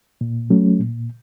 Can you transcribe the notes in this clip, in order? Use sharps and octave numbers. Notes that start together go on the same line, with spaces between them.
A#2
F#3 A3 C#4
A#2